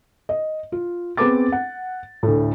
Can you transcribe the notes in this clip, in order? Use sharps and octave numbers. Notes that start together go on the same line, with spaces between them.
D#5
F4
B3 C4 G#4 B4 D6 A6
F#5
D2 A2